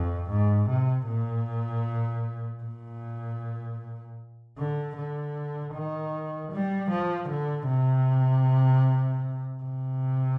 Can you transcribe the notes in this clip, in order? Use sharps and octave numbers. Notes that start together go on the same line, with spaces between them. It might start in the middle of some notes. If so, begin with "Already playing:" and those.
Already playing: F2
G#2
C3
A#2
A#2
D3
D3
D#3
G3
F3
D3
C3
C3